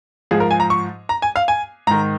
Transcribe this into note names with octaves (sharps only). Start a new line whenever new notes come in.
G#2 F3 G#4
A#4
G#5
A#5
C#6
A#5
G#5
F5
G#5
G#2 D#3 A#5